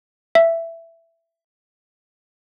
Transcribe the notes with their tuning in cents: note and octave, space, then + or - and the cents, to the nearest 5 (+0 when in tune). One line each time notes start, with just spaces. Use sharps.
E5 +10